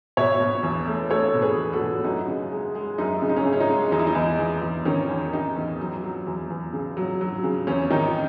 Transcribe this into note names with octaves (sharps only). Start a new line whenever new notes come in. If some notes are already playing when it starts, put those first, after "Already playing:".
B2 C#5 E5
B2
E2
A3
A3 A4 C#5
B2
G#4 B4
E2
F#4 A4
B2
F#2 D#4 F#4
C#3
G#3
G#3
F#2 D#4
C#3
D#4
C#4
C#3
C#4
D#4
G#3
E2 D#4
E4
D#4
E2
E2
E2
D#3 C#4
E2
D#3 D#4
E2
F#3
F#3
E2
E2
C#3
F#3
F#3
C#3
E2 C#4
D#3 D#4